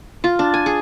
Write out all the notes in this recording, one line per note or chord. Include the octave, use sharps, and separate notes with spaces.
F4
D4
G#5
G#4